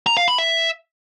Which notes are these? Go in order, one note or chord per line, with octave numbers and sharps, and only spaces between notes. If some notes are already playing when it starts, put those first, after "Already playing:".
A#5
F5
B5
E5